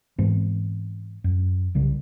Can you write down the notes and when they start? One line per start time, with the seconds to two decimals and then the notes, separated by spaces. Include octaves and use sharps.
0.19 G#2 E3 B3 C4
1.24 F#2
1.75 C2 C#3 G3